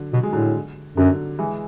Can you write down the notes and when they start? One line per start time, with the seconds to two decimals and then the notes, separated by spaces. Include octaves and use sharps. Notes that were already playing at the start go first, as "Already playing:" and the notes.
Already playing: D3 F#3
0.13 B2 F#3
0.23 G#3
0.33 A2 D3 F#3
0.97 F#2 D3 F#3
1.39 E3 G#3